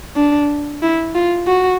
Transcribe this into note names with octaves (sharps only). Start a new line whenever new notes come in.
D4
E4
F4
F#4